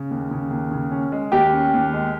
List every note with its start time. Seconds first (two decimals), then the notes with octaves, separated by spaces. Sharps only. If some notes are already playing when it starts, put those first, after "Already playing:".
Already playing: C#3
0.11 D#2
0.31 C#3
0.50 D#2
0.72 C#3
0.91 C#4
1.12 G#3
1.32 D#2 G4
1.53 C#4
1.74 D#2
1.93 G#3